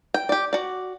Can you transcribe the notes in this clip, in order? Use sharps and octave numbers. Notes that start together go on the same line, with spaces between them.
G5
G4 D5
F#4 D5